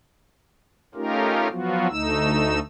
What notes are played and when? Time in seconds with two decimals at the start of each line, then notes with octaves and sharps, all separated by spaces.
0.95 A3 C#4 D#4 F4 G4 A#4
1.51 F3 F#3 B3 F4 F#4
1.89 D2 A3 D#4 E6